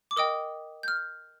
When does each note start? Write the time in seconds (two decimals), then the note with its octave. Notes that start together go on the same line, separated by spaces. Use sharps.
0.11 D6
0.16 A#4 D#5 G5 D#6
0.83 G6
0.88 F6